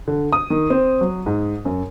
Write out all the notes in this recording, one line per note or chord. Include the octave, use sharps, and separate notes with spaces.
D3
D#6
D#3
C4
F#3
G#2
F#2